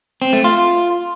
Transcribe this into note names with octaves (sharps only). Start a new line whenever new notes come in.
C4
A3
F4